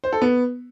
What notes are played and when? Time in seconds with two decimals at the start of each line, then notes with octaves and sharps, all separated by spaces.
0.04 C5
0.13 A4
0.22 B3